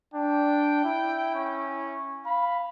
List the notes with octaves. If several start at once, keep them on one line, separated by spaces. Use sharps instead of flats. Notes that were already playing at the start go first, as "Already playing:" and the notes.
D4 G5
E4
C#4
F5 B5